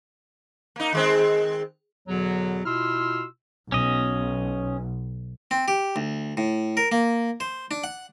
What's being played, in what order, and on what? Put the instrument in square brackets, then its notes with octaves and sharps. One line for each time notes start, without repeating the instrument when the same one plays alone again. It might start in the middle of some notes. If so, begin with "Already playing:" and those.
[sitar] A#3 D#4
D#3 G#3 C4
[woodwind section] E2 B2 D3 F#3
B2 E4 F4 C6 E6 F6
[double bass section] B1 [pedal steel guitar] C#4 D#5
[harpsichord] C4
G4
D2
A2
A#4
A#3
C5
D4
F#5